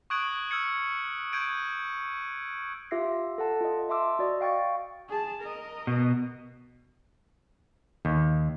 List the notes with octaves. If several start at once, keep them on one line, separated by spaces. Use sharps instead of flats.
C#6 D#6 F#6 G#6 D7 F#7
E6 F6 G#6 C#7
C#6 G6 G#6 D7 D#7
F4 G4 E5 E6 A#6 C7
A4 F#5 A5
F4 D#5
E5 A5 C6 D6 E6
F#4 D5 D#5
F5 G5 C#6 A6
G#4 A5
A#4 D#5
B2
D#2